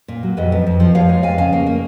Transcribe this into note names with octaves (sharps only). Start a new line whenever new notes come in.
A#2
F#3
F2 B4 D#5
F2
F2
F3
F3 C#5 F5
G#3
F2 F5 G#5
C#3 F5 G#5
A#3
A#3